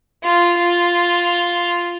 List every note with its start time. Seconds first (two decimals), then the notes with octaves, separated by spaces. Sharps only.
0.24 F4
0.58 F4